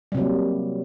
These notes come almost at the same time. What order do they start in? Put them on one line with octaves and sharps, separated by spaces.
G3 C3 F#3 A#3